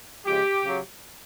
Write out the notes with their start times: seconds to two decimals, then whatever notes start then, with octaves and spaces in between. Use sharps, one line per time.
0.26 C#3 F3 G#3 G4
0.64 C#3 F#3